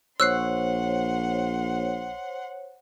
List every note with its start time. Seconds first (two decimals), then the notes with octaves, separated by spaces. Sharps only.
0.20 A#1 C5 C#5 F#5 C6 E6 F#6 C7